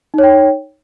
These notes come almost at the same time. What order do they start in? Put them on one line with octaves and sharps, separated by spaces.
D#4 C#5 G5